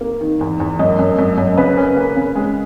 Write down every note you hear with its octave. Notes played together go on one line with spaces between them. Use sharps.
A#3
D#3
E2
E2
F#2 D#5
F#2
F#2
F#2
C#3 B4
C#4
A#3
C#3
G#3